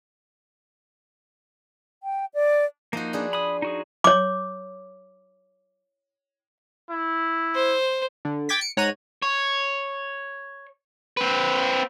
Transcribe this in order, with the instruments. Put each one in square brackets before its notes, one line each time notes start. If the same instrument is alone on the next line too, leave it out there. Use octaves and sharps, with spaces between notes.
[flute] G5
D5
[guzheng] F3 F#4 [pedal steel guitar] A#3 D#4
[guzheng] D4 G#4 B4
[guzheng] G#5 [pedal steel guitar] B5 D#6
[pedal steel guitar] D#4 F#4 G#4
[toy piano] C#5 D6
[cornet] E4
[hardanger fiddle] C5
[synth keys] D3
G5 D6 G#6 A6 B6
C#7 D7
G#2 C#5 F#5 A#5 F#6 D#7
[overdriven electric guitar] C#5
C4 B4